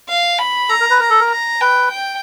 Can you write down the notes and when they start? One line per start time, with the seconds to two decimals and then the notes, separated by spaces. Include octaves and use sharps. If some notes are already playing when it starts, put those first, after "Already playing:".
0.09 F5
0.39 B5
0.70 A4 A#5
0.80 A#4
0.90 B4
1.00 A#4 A#5
1.10 A4
1.20 A#4
1.31 A#5
1.61 B4 G5
1.92 G5